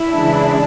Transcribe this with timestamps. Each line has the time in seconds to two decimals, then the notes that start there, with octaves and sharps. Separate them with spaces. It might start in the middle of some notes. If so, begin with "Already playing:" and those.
Already playing: E4
0.11 C#3 E3 G#3 D4